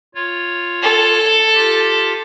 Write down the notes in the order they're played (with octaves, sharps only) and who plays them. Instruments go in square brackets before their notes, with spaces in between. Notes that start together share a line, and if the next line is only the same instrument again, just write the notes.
[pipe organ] F4 C#5
[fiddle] A4
[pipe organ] F4 G4